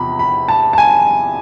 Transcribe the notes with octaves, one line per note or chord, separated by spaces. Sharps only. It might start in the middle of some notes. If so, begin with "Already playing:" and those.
Already playing: E2 C3 F3 B5
B5
A5
A5
G#5